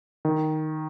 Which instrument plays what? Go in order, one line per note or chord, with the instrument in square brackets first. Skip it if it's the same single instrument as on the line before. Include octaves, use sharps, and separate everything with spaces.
[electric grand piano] D#3